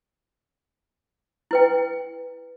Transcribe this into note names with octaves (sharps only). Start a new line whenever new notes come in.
E4 B4 G5